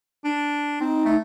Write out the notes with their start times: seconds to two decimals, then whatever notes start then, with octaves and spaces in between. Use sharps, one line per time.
0.25 D4
0.81 C4 D#4
1.05 A3